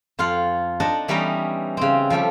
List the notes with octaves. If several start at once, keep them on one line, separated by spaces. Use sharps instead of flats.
F2 F4 F5 F#5
D4 D#4 D#5 F#5 A5
E3 G3 B3 C#4 D#4 D#5
C#3 C4
F3 G3 A3 G4